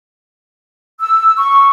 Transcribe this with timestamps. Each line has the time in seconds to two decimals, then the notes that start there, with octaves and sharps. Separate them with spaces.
0.99 E6
1.37 C#6